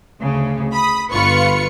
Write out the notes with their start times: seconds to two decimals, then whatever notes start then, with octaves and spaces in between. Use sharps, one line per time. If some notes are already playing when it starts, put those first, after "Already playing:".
0.22 D2 C#3
0.73 B5 D#6
1.12 G1 F4 B4 C#6 C#7